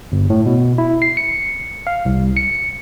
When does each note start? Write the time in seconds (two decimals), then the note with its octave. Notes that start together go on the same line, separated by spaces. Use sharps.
0.12 G1
0.30 A2
0.46 B2
0.78 E4
1.02 C7
1.17 C#7
1.87 F5
2.05 C2
2.37 C#7